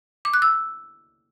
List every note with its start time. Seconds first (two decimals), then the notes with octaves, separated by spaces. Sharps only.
0.25 D6
0.34 F#6
0.42 E6